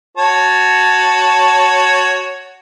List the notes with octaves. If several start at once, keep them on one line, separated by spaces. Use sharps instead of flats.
F#4 C#5 A5